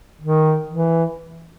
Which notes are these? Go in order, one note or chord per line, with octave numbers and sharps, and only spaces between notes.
D#3
E3